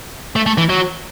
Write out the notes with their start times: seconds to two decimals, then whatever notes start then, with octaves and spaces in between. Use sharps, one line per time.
0.36 A3
0.46 A3
0.58 E3
0.69 F#3